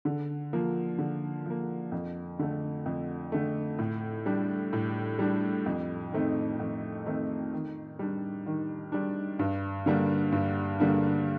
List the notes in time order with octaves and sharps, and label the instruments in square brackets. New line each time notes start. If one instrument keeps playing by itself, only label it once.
[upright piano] D3
F3 A#3
D3
F3 A#3
F2
D3 A3
F2
D3 A3
A2
G3 D4
A2
G3 D4
F2
D#3 A3 C4 D#4
F2
D#3 A3 C4 D#4
D#3
G3 D4
D#3
G3 D4
G2
D3 G3 A#3 D4
G2
D3 G3 A#3 D4